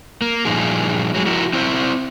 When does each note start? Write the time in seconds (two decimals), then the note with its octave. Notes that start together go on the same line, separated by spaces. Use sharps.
0.22 A#3
0.45 G2 A#2 F3 D#4 G#4
1.14 F#3 G#3
1.26 F3 E4 F#4 A#4
1.53 C4 E4 C5